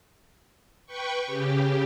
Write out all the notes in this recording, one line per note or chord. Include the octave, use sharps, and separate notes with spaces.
B4 G5 C#6
C#3 G4